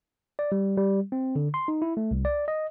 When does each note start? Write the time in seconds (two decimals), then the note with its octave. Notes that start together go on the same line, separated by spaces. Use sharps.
0.39 D5
0.52 G3
0.77 G3
1.12 C4
1.36 D3
1.54 C6
1.68 D#4
1.82 E4
1.97 A3
2.11 C2
2.25 D5
2.48 D#5